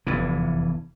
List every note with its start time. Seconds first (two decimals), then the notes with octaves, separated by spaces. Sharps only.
0.07 F1 E2 G2 E3